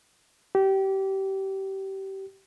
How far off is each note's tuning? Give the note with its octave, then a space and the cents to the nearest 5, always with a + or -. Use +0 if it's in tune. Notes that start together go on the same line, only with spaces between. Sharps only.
G4 -25